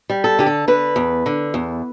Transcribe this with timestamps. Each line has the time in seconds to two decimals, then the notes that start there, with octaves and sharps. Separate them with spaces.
0.10 G3
0.24 A4
0.39 D3 G4
0.46 A4
0.68 D3 B4
0.96 E2
1.26 D3
1.54 E2